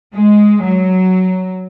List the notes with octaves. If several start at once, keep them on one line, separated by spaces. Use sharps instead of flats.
G#3
F#3